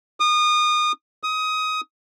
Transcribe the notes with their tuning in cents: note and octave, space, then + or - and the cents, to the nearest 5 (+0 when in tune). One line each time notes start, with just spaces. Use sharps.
D#6 -30
D#6 +20